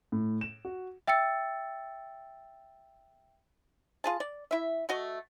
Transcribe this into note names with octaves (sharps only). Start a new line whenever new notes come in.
A2
E7
F#4
E5 G5 E6 A6 C#7
F4 G#4 A5
D5
E4 E5
A3 F#4 D#5